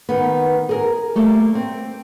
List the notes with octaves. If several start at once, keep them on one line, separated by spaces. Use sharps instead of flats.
D#3 B3
G#4 A#4
G3 A3 A#3
C4